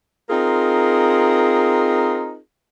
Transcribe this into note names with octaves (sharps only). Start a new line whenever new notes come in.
C4 D#4 F4 G#4 A#4